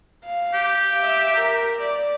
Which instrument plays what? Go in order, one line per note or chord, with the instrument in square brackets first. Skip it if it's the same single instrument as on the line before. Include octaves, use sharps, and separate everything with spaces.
[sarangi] F5
[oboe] G4
[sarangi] E5
A#4
D5